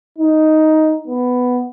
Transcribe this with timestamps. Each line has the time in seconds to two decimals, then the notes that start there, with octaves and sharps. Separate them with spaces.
0.18 D#4
1.08 B3